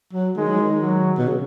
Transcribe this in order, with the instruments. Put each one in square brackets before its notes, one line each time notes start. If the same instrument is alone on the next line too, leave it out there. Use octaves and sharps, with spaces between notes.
[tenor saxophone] F#3
[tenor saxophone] D#3 [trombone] G#3
[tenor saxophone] F#3
D#3
[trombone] F#3
[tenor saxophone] B2
C#3